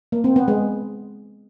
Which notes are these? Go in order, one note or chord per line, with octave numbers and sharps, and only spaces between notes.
A#3
C4
B3
G#3